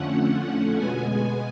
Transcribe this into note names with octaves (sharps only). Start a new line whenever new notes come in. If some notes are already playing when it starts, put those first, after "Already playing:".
Already playing: F2 D3 F3 A3 C#4 F#5
B2 G#3 B3 G#5